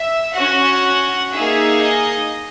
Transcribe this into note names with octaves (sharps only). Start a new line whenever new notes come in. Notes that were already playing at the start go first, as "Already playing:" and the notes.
Already playing: E5
C#4 F#4 F#5
A#3 D#4 G#4 E5
D#5